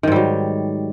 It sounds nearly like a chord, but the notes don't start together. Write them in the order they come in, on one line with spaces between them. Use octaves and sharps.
D#3 G#2 G3 F#3